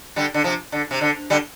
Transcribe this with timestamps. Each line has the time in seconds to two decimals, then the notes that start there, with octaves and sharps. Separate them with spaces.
0.16 D3 G3
0.34 D3
0.44 C3 F3
0.72 D3
0.91 C3
1.01 D3
1.30 D3 G3